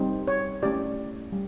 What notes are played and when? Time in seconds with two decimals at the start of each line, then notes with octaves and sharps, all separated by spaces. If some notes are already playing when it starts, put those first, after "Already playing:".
Already playing: G3 C4 D#4
0.28 C#5
0.63 A3 C#4 E4 G4 D5
1.32 G3